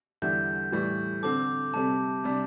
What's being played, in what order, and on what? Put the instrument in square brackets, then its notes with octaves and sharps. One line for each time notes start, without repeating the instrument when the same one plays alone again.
[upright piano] E2 D3 G3 E4 [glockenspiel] G6
[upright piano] A2 E3 G3
[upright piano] D3 C4 A4 [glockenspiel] D6
[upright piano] C3 G3 C4 A4 [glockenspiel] A5
[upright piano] C3 G3 D4